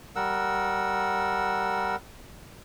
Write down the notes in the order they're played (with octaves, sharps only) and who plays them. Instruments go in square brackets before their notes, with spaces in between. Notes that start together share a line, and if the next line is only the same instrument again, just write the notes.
[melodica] G3 A#4 F#5 E6